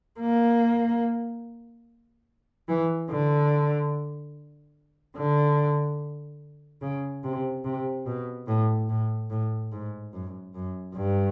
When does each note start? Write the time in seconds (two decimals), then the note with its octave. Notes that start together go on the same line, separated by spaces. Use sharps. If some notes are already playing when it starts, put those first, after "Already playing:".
0.20 A#3
2.69 E3
3.10 D3
5.17 D3
6.82 C#3
7.24 C3
7.65 C3
8.06 B2
8.47 A2
8.89 A2
9.30 A2
9.72 G#2
10.13 F#2
10.54 F#2
10.96 G2